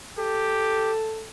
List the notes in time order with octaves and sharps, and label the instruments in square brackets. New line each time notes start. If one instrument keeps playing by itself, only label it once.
[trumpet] G4 [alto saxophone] A4